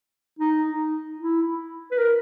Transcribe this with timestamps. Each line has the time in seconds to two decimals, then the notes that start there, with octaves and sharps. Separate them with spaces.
0.39 D#4
1.19 E4
1.92 B4
1.98 A#4